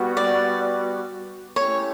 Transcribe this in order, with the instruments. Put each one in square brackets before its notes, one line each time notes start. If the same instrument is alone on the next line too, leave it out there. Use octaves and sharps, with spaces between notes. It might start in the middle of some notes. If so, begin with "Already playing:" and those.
Already playing: [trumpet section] G3 B3 F#4
[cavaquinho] D5
[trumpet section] A3 C#4 E4 G4 [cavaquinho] C#5